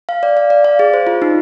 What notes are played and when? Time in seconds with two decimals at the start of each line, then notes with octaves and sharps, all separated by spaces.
0.09 F5
0.23 D5
0.37 F5
0.50 D5
0.65 F5
0.79 G#4
0.94 C5
1.07 F4
1.22 D#4